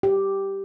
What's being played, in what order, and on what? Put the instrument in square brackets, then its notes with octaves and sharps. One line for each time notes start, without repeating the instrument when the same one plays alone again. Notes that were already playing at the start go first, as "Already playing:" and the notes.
[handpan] G4